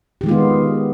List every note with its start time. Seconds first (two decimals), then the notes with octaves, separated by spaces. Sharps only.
0.21 G4
0.24 D#3
0.26 G#3
0.29 F4
0.31 B3